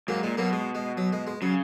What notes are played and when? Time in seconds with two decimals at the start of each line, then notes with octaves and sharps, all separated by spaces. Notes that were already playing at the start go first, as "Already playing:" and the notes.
0.08 G#2 F#3 A#3
0.23 A#2 G#3
0.37 B2 F#3 A#3
0.53 G#3
0.75 G#3
0.97 F#3
1.13 G#3
1.27 G#3
1.42 C#3 F#3